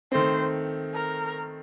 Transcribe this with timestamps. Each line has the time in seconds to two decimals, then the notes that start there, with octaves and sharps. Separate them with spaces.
0.12 D#3 A3 C4 C5
0.93 A#4